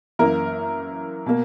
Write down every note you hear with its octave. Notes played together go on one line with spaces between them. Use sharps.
F#2 E3 A#3 A#4
B2 A#3